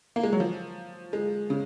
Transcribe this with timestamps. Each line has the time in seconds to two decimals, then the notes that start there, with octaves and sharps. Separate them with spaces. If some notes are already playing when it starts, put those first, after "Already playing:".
0.16 A#3
0.23 G#3
0.33 F#3
0.40 F3
1.13 G#3
1.50 C#3